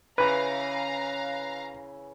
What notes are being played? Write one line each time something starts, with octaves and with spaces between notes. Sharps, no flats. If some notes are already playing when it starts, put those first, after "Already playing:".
C#3 E3 B4 F5 A#5